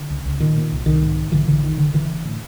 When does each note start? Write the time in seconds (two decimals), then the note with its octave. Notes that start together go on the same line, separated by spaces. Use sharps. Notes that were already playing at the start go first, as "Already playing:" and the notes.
Already playing: D3
0.10 C#2
0.26 C#2
0.40 A#2 D#3
0.56 A#2
0.72 C2
0.86 C2 D#3
1.02 G#2
1.17 G#2
1.32 A#1 D3 E3
1.47 A#1 D3 E3
1.63 F2 D#3
1.78 F#1 D3
1.94 F#1 D3 E3
2.09 D3
2.25 A2